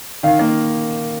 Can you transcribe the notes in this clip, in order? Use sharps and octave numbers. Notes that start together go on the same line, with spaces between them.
D#3 F5
A#3